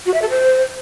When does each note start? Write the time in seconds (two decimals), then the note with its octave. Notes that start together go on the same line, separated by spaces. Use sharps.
0.06 F#4
0.14 E5
0.22 A4
0.30 C5